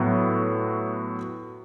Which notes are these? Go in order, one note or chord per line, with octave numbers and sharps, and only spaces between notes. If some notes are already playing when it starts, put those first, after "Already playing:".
Already playing: A2 F#3 B3